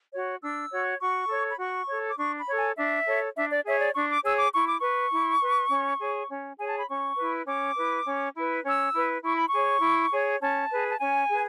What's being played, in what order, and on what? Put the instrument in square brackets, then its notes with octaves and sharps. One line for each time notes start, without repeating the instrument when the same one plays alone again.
[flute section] F#4 C#5
D4 E6
F#4 C#5
F#4 C#6
A4 C#5
B5
F#4 C#6
A4 C#5
D6
D4 C#6
B5
A4 C#5
G#5
D4 E5
A4 C#5
D4 E5
D5
G#4 C#5 E5
D5
D4 C#6
D6
G#4 C#5 E6
D6
E4 C#6
D6
B4 C#6
E4
B4
C#4
G#4 C#5
C#4
G#4 C#5 G#5
A5
B5
C#4 C#6
E4 B4
C#4 D6
E4 B4
C#4
E4 B4
C#4 E6
E4 B4
E4 C#6
B5
C#6
G#4 C#5
E4
G#4 C#5
C#4 A5
G#4 B4
A5
C#4 G#5
G#4 B4